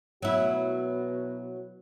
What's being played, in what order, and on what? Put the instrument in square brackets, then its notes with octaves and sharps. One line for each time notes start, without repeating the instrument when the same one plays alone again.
[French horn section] B2 B3 F#4 [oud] F#3 E4